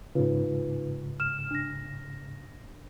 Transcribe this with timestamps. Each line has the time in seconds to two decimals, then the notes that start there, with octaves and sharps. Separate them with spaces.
0.15 G#2 C#3 D#4 F4 B4
1.20 F6 E7
1.51 D4 A#6